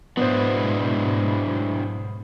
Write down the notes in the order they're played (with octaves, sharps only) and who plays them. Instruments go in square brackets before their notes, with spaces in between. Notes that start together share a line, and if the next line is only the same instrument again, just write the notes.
[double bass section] G#2 B2 [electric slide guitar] F#3 D4 E4 [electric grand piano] B3 C5